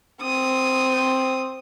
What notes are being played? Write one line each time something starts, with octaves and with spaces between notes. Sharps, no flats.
C4 D#6